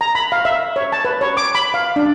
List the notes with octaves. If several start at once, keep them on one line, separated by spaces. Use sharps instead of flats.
A#5
B5
F5
E5
C#5
A5
B4
C#5
D6
B5
F5
D4